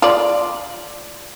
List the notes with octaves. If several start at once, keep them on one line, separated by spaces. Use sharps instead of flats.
F4 D5